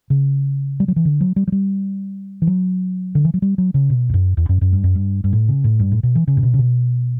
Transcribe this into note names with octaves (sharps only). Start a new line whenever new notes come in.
C#3
G3
F#3
E3
D3
F#3
G3
F#3
G3
E3
F#3
D3
E3
F#3
G3
F#3
C#3
B2
E2
F#2
E2
F#2
F#2
G2
F#2
G2
G2
A2
C#3
A2
G2
A2
B2
E3
C#3
A2
B2
C#3
B2